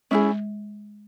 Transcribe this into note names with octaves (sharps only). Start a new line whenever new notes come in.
G#3 C#4 E4 G#4